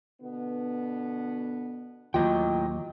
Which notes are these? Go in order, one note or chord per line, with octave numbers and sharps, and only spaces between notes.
B2 D3 B3
D#2 A2 F#3 F4 D#5 G5